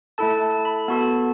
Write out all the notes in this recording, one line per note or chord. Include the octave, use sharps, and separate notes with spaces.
A3 E4 A4 A5
A5
B5
B3 F#4 A4 A5